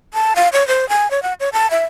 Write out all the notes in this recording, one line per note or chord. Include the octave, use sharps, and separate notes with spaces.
A5
F5
C#5
C5
G#5
C#5
F#5
C#5
A5
E5